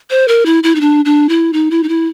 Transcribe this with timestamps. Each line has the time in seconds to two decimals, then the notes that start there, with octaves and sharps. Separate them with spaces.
0.10 C5
0.28 A#4
0.46 E4
0.63 E4
0.75 D#4
0.81 D4
1.05 D4
1.29 E4
1.53 D#4
1.71 E4
1.83 D#4
1.89 E4